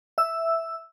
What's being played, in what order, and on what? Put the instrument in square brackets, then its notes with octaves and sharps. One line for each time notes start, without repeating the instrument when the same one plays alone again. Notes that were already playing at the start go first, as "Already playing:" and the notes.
[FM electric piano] E5 E6